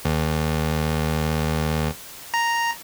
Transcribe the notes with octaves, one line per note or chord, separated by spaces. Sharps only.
D#2
A#5